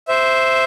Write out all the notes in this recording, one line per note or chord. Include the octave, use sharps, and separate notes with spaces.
C5 E5